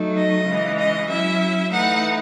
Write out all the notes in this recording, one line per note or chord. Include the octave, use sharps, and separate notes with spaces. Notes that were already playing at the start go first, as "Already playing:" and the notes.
Already playing: F#3 A3 D#4
D#5
C#3 E3 G#3
D#5
F#3 C#4 E4 E5
E3 A3 D#4 F#5